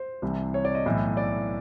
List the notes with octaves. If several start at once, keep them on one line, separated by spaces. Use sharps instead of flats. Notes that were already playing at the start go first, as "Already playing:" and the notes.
Already playing: C5
C2 C3 E3
C#5
D5
D#5
B1 A2 E3
D5